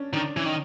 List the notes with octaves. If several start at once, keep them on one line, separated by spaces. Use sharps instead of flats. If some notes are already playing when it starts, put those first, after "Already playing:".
Already playing: C#4 D4
D#3 D4
E3 C#4
D#3